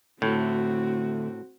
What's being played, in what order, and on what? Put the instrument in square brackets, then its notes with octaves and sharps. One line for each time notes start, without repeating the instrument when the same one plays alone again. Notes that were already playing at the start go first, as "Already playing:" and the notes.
[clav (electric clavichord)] A2 [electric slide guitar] D3 A3 [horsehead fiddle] C4 F#4